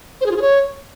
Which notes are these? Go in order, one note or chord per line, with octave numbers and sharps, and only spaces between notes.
C5
G#4
F4
G#4
C#5